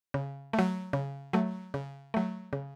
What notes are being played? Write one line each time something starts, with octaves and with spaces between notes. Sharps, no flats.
C#3
A3
F#3
C#3
F#3 A3
C#3
F#3 A3
C#3